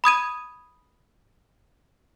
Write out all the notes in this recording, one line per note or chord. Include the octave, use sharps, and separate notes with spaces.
B5 D#6 G#6 D#7